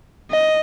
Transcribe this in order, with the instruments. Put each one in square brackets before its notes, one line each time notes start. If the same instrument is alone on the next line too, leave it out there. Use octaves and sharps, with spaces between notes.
[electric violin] D#5